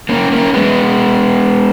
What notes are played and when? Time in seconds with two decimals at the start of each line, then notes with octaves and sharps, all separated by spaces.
0.09 A#3 C#4
0.32 A#3 C#4
0.54 G#3 B3